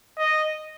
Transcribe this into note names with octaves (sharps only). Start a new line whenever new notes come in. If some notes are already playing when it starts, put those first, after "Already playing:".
D#5